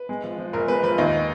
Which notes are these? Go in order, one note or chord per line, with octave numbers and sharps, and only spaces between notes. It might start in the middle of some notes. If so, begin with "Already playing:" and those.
Already playing: B4
G#3
F3
F3
F#1 A#4
G#3 B4
F3 B4
D#2 D#4